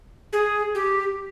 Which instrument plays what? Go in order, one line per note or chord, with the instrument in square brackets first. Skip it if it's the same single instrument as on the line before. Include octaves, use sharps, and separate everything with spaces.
[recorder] G#4
G4